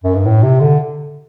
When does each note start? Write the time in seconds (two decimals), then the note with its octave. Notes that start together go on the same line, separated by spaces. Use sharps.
0.04 F#2
0.15 G2
0.26 A2
0.43 C3
0.61 D3